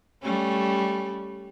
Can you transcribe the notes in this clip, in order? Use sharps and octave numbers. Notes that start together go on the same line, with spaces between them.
G3 A3 C#4